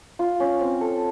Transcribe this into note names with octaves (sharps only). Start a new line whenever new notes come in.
F4
C#4
C4
A4